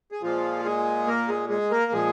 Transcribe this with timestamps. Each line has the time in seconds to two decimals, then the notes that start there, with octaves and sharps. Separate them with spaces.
0.12 G#4
0.22 A#2 F3 G#3 F4
0.65 G#3 G#4
1.07 A#3 A#4
1.28 G#3 G#4
1.50 G#3 G#4
1.71 A#3 A#4
1.92 A#2 F3 G#3 G#4